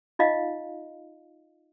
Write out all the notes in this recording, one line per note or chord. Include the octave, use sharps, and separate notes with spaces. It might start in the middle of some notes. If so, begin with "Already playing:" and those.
D#4 F4 D#5 F5